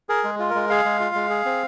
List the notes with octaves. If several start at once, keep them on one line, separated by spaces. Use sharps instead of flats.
G#4 A#4
G#3
F4
G#3 A#4
G#4 F5
G#3
F4
G#3
G#4
C4